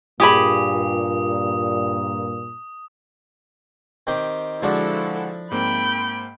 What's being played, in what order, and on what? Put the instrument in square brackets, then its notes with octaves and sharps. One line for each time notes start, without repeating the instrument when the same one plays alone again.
[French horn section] G2 A#2 [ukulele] G4 G#4 B5 [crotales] D#6
[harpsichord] D#3 C4 G4
[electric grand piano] D3 G#3 F#4 [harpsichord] F3 D4 [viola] E4 A4
[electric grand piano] G#2 A#3 C4 [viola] G5 B5